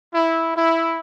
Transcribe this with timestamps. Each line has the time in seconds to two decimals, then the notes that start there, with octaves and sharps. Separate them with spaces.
0.14 E4
0.56 E4